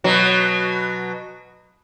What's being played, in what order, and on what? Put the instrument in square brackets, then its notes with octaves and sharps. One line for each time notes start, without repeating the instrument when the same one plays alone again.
[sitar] B2 F#3